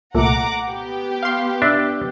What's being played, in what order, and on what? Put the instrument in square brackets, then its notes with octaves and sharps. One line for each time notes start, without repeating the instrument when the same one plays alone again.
[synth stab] C2 A#2 A3 [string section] F#5 A#5 D6
[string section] B3 G4
[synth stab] F5 C6
[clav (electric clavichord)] D4 [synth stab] E5